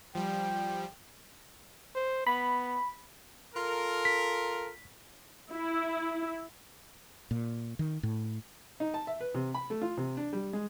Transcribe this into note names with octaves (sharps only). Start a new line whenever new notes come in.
F3 G3 G5
C5
B3 B5
F4 A4 A#4
B6
E4
A#2
D#3
A2
D#4
A5
E5
B4
C3
B5
A3
F4
C3
D4
G3
G#3